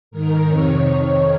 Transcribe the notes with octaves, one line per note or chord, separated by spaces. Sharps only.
G#2 D#3 A#4
F2 C3 D#3 C#5
F2 D#3 C#5